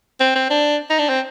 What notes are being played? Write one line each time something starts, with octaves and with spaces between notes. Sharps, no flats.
C4
C4
D4
D#4
D4
C4